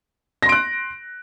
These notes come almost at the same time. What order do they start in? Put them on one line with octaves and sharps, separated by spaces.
A#6 C6 D7 F#6